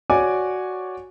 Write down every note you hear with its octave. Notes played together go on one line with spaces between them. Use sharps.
F#4 C#5 D5 G#5 D6